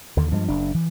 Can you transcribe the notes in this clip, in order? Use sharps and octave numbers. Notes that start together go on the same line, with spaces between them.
D#2 D3
G2 F3 G#3
F#1 D4
E3